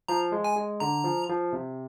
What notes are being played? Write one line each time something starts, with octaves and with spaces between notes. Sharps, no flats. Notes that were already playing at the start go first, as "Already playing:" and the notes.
F3 A#5
G#3
G#5
G#3
D3 A#5
F3
F3
C3